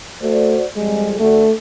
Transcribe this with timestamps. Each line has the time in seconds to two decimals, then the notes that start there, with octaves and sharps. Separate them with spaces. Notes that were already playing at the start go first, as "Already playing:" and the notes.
0.22 A3 F#4 C5 D5
0.76 F2 G3 G#3 G#4
1.20 D2 A3 D4 F#4